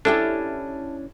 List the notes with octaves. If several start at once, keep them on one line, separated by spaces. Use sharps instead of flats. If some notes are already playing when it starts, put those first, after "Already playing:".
C#4 D4 E4 G4 A4